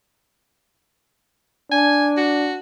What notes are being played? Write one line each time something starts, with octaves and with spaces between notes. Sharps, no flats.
D4 G#5
F#4